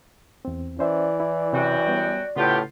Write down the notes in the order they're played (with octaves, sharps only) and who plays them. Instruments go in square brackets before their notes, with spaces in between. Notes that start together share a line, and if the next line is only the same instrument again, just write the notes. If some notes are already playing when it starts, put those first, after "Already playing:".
[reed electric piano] E2 C4
[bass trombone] E3 [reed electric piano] C#4 C5 E5 [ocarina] D5
[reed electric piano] E4
[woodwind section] F#2 F#4 G5 [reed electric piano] C3
[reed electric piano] G3 B3
[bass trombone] A2 [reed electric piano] C#3 [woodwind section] B3 F4 G4